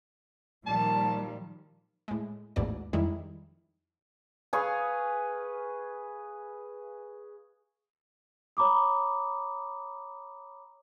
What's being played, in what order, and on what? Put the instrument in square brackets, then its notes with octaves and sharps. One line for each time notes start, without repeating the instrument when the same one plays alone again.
[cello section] A#2 G3 [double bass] D#3 F3 [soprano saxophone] A5
[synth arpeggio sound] A2 G#3
A1 D#2 G#2 B2 D5
F2 D#3 G3 G#3 D#4 E4
[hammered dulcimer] G#4 B4 F5 C#6
[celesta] C#5 A#5 B5 D6 D#6